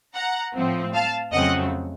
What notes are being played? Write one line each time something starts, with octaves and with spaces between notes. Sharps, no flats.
F#5 A#5
A2 F3 C4
F5 A5
F2 C#3 F#3 A3 C4 D#5 F#5